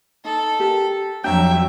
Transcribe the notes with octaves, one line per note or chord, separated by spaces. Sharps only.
D#4 A4
G4 A#4 A5
F2 F#3 D4 E5 G5 A#5